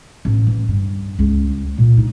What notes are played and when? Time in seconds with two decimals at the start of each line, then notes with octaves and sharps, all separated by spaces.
0.25 A1
0.47 E3
0.68 G2
1.19 C#2
1.78 A#2
1.98 D#4